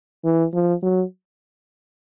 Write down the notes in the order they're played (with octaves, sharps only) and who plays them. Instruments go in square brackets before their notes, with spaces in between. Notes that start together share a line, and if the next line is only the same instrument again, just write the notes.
[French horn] E3
F3
F#3